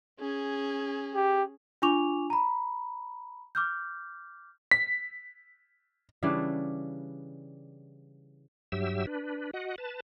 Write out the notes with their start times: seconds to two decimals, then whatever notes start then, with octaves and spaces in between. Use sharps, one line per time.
0.20 C#4 G#4
1.15 G4
1.82 D4 F4 G#5 C#6 D6 F7
2.30 A#5 B5
3.55 D6 F6 G6
4.71 B6
6.23 C#3 E3 G3 D4
8.72 G2 F#3 G4 E5 E6
9.07 D4 B4
9.53 F#4 D#5 F#5
9.78 B4 A5